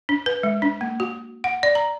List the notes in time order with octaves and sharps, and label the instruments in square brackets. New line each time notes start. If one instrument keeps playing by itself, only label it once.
[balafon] D4
B4
G#3
D4
A#3
F#4
F#5
D5
A#5